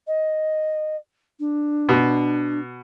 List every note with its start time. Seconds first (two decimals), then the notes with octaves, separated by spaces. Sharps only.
0.07 D#5
1.40 D4
1.89 B2